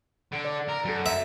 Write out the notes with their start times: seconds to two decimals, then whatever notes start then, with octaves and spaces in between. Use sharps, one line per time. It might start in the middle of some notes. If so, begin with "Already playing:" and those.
0.32 D3
0.45 D5
0.68 A#4
0.85 F#2 F#3 A4
1.06 E5